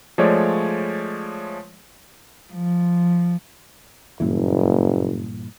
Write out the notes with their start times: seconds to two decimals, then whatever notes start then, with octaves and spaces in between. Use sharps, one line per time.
0.18 F3 G#3 A3 C#5 D5
2.53 F3
4.20 F#1 G2 A#2 E3